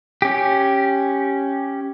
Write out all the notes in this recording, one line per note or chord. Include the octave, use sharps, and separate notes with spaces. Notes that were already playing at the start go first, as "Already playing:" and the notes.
C#4 G4